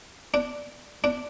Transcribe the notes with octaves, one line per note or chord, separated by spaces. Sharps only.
D4
D4